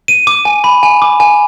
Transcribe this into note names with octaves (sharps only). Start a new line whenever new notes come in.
D#7
D6
G#5
B5
G#5
D6
G#5